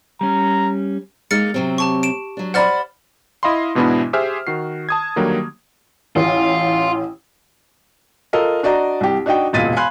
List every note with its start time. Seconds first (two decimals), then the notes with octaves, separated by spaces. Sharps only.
0.21 G3 C#4 A#5
1.31 G#3 A#3 D#4 F6 A6 C#7
1.54 C3 F#3 C4
1.78 G4 A5 C#6
2.03 D7 E7
2.37 F#3 D4
2.54 C5 D5 F#5 B5 F6 A6
3.43 E4 D#5 F5 B5 C6
3.75 G#2 B2 E3 B3 D4 E4
4.13 G4 G#4 C5 E5 G#5 F6
4.47 D#3 F#4 C7
4.89 A5 D#6 G#6
5.16 D3 D#3 F#3 G3 A#3
6.16 A1 F4
8.33 F4 A4 A#4 D#5
8.63 D4 F#4 D5 D#5 A#5
9.01 C2 G4
9.26 D4 D#4 F#4 D#5 G5
9.53 E1 C#2 A#2 A6 B6 D#7
9.76 F5 G#5 B5 C6 F#6